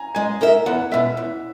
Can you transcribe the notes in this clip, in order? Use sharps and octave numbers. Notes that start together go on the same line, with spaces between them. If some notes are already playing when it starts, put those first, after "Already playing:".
Already playing: G#5 A#5
G#3 G#5
D#4 A#4 E5
E2 F#5
B2 G#3 E5
E2